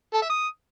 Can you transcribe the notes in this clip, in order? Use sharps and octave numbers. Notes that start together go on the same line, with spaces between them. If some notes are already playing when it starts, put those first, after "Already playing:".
A4
E5
D#6